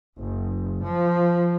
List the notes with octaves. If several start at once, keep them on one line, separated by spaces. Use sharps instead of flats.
F#1
F3